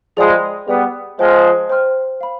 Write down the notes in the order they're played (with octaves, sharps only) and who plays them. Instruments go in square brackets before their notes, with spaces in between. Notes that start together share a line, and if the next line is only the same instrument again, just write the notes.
[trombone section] F3 G#3 [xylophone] G#4 D5 G5 B5 D#6
[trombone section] G3 B3 [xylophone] G#4 D5 G5 B5 D#6
[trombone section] F3 G#3 [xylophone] C5 G5 C6 F6
[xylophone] C5 G5 C6 F6
F5 B5